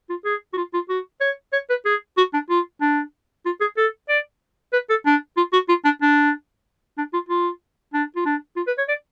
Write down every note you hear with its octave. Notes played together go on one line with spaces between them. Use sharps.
F4
G#4
F#4
F4
F4
F#4
C#5
C#5
B4
G#4
F#4
D4
F4
D4
F4
G#4
A4
D5
B4
A4
D4
F4
F#4
F4
D4
D4
D4
F4
F4
D4
F4
D4
F4
B4
C#5
D5